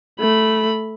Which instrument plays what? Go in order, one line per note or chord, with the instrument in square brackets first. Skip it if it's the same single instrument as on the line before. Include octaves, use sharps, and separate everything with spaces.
[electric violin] A3 B5